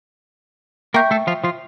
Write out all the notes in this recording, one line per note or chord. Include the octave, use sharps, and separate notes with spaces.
A#3 A#4 E5 G5 C#6 G6
A3 A4
F3 F4
F3 F4